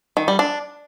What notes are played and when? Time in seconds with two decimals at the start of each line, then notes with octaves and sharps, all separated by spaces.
0.17 D#3
0.28 G3
0.39 D4